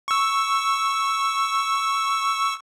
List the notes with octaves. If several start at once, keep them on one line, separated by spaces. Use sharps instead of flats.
C#6 E6